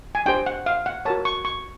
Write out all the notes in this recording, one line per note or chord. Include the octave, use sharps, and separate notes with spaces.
G#5
D4 G4 C5 G5
F#5
F5
F#5
F#4 A#4 C#5 A5
C#6
C#6